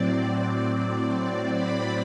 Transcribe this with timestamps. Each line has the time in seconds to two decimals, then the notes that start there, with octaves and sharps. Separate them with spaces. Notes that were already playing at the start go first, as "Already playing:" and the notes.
Already playing: A2 F#3 C4 D5
1.52 B5